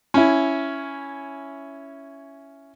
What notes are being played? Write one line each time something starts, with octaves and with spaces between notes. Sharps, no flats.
C#4 E4